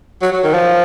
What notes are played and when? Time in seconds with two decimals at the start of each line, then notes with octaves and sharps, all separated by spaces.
0.22 F#3
0.32 F#3
0.44 D#3
0.54 F3